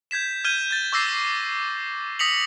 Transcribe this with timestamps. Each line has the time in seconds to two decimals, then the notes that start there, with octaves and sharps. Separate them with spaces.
0.11 G6 G#6 B6 E7
0.44 F6 G6 G#6 D#7 G7
0.71 G6 A6
0.92 C#6 D6 E6 A#6 C7
2.19 D#6 A#6 B6 C#7 F7 F#7